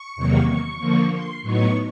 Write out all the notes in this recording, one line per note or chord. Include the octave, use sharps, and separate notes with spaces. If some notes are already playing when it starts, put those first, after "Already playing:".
Already playing: C#6
E2 C3 D#3 F#3 A#3
C#6
D3 F3 A#3
C6
A2 F#3 B3 D#4 C#6